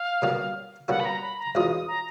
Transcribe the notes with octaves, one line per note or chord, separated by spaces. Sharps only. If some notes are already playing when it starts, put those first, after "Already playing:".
Already playing: F5
B2 G3 A#3 C#4 F#4
B2 G3 A#3 C#4 F#4 F#5
B5
A#5
B5
A#5
E2 B2 G#3 C#4 F4 D#6
D#6
A#5